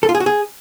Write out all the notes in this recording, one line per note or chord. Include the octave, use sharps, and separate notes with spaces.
A4
F4
G#4
F#4
G#4